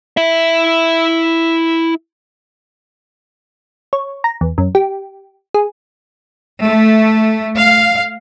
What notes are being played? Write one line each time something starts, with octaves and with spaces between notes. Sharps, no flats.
E4 E5
C#5
A#5
E2
F#2
G4
G#4
A3
F5